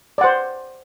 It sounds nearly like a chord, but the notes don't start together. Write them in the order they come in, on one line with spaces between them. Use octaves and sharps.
D5 F#5 C5